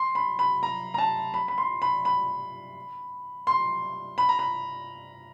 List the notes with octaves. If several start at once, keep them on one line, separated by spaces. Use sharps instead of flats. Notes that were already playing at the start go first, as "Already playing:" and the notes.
Already playing: C6
B5
B5
A#5
A#5
A5
B5
B5
C6
B5
B5
C6
B5
A#5
B5